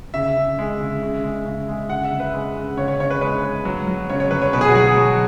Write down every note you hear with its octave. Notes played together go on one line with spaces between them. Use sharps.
C#3 E5
C#3
G#3
C#3
C#3
G#3
C#3
G#3
C#3 F#5
E5
C#3
B4
G#3
C#3
C#3 C#5
C#5
C#3 C#5
B4
G#3 B4
G#3
F#3
F#3
C#3 C#5
C#5
F#3 B4
C#5
B2 B4
G#4
F#4
F#3 G#4
F#3